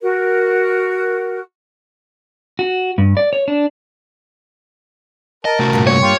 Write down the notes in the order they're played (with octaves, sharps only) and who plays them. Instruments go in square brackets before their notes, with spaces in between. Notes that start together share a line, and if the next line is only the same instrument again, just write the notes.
[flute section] F#4 A#4
[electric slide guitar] F#4
G2
D5
C#5
D4
[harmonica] A#4 A5 [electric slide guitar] D#5
[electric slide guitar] C3 A3 F#4
[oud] G2 A#2
[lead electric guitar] C#5
[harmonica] F4 G4